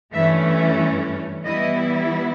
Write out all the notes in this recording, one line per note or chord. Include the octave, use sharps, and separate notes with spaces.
G2 E3 A3 C#4 E5
E5
E3 G3 B3 E4 D#5